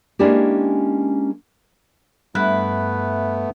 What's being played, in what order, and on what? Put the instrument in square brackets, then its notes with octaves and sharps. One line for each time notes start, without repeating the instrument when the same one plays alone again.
[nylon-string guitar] G#3 A#3 C#4 D4 E4 G4
[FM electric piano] G2 [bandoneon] A3 B3 [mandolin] E4 [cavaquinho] B4